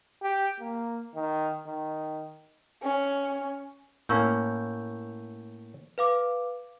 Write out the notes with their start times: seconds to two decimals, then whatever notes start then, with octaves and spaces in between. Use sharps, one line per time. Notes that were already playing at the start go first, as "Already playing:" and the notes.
0.22 G4
0.60 A#3
1.15 D#3
1.67 D#3
2.83 C#4
4.09 A2 A#3 C#4 C#6 E6 G6
5.98 B4 F5 D6